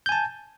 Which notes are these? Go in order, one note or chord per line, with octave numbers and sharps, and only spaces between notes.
G#5 A5 G6